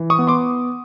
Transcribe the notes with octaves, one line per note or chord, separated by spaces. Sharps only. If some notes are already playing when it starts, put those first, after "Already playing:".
Already playing: E3
C#6 D#6
B3
C6 D6